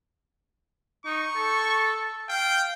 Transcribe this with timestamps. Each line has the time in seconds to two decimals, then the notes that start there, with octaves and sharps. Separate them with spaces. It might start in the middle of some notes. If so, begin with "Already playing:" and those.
1.06 D#4 C#6
1.36 A4
2.29 F5 G5